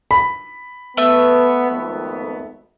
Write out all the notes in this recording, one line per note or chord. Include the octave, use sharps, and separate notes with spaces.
B5
A3 B3 E5
G#1 F2 B3